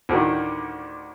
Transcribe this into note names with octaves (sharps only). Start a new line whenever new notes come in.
D2 A2 D3 D#3